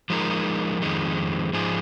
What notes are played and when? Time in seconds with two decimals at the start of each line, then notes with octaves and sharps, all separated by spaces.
0.10 F3 G#3 D#4 A#4
0.81 F2 D#3 G#3
1.53 G#2 F3 D#4 G#4